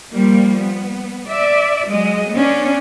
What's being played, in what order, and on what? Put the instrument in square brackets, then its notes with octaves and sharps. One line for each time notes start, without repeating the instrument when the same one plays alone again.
[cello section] F3 G3 A#3
B3
D5 E5
F#3 G#3 D#5
B3 C#4 D4